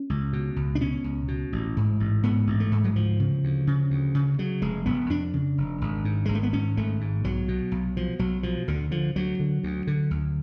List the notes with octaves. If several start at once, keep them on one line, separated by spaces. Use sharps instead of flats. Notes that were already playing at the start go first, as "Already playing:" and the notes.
Already playing: C#4
C#2
B2
C#2
D4
B2 C#4
C#2
B2
A1
G#2
A1
G#2 B3
A1
A3
G#2
F#3
D2 F3
C#3
D2
C#3
D2
C#3
C#3 F#3
F1 G#3
F1 B3
F2 D4
C#3
F1
G#1
G#2
G#1 G#3
A3
B3
G#2 C#4
G#1 A3
G#2
B1 F#3
B2
B1
B2 F3
B1 F#3
B2 F3
D2 D3
D3 F3
D2 F#3
D3
D2
D3
D2